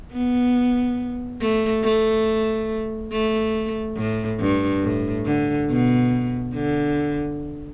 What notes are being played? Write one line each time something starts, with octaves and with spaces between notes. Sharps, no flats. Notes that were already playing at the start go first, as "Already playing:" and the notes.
B3
A3
A3
A3
A2
G2
A2
D3
B2
D3